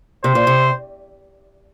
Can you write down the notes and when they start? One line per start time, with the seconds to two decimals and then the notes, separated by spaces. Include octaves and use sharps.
0.24 C3 C5
0.35 A#2
0.47 C3